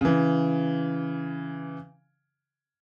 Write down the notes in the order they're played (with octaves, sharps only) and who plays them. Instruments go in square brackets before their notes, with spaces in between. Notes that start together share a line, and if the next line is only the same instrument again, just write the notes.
[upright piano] C#3 E3